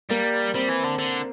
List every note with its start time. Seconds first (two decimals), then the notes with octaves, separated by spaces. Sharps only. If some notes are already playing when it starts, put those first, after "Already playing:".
0.11 G3 A#3
0.55 G3 C4
0.69 E3
0.84 D3
0.99 D3